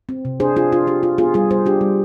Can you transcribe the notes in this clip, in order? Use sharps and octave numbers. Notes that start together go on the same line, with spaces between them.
C4
C3
D4 G#4 C5
D4 F4 G#4
D4 F4
D4 G4
F4
B3 F4 G#4
G3 F4 G#4
G3 G#4 C5
D4 G4
G3